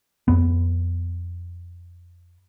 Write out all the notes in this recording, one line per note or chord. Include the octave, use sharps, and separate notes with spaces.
F2 B3